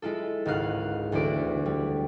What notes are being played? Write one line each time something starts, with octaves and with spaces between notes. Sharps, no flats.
G#3 E4 F4 A4
G#1 C#2 G#2 D#4 F5 F#6
E1 D2 E4 D5 D7
G3